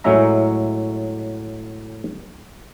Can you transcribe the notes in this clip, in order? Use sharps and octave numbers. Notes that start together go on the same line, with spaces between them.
A2 F#3 G#3 C#4 E5 A#5